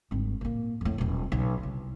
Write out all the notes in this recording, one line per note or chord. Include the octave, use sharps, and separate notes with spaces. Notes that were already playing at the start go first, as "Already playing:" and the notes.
G#1 G2
A#2 A#3
F2 A2
D#1 B1
B1
C2